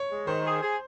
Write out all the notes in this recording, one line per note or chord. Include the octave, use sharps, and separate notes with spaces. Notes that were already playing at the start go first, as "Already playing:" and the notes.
Already playing: C#5
G#3
D#3 C5
G#4
G#4